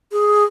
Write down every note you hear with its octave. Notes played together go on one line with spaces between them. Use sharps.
G#4